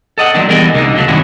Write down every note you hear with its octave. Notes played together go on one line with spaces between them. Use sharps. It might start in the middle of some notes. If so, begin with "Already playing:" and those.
A4 D#5 F#5
F3 F#3 A3 A#3 D4
E3 G3 B3 G#4 A#4 D#5
C2 D3 A#3 D#4
C#2 F3 F#3 A3
G2 C3 D#3 C#4 E4 F#4